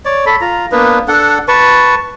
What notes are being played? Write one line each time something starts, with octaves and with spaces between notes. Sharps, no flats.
C#5 D5
A4 B5
F4 A#5
A#3 B3 D4 B4
D4 A4 F#5
B4 A5 C#6